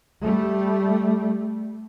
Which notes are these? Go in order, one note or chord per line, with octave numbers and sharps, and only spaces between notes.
G3 A3